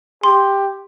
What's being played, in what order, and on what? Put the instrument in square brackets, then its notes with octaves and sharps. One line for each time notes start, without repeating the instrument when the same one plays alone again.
[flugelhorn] G4 [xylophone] C6